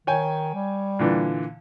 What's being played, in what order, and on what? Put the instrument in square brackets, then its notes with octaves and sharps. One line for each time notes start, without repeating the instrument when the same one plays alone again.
[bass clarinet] D#3 [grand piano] C#5 G5 G#5
[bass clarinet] G3
[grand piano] A#2 D3 E3